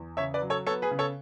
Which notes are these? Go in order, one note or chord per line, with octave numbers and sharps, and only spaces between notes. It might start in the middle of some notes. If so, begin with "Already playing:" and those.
Already playing: E2
C#3 C#5 E5
B4 D5
F#3
A4 C#5
B3 A4 C#5
G#4 B4
C#3
A4 C#5